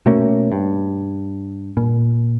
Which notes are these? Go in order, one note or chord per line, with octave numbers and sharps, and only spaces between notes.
B2 A3 A#3 C#4
G2
A#2